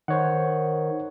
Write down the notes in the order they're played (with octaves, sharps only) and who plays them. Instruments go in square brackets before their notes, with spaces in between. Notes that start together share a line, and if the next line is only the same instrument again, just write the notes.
[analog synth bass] D#3 [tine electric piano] C5 C#5 F#5